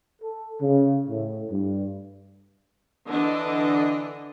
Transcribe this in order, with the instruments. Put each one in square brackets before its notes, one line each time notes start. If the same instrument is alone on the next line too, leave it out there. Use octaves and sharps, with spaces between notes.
[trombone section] A4
C#3
A2
G2
[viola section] D3 E3 D4 D#5